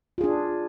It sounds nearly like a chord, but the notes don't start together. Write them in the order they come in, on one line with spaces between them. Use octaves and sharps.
F4 G#4 D4